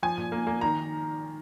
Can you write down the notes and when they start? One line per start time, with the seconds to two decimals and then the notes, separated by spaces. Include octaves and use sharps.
0.03 F3 G#5
0.18 A#2
0.32 A#3
0.47 A#3
0.61 D#3 A#5